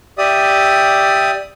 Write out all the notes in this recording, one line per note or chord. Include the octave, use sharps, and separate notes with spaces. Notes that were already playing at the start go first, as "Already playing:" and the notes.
G4 D5 E5 D#6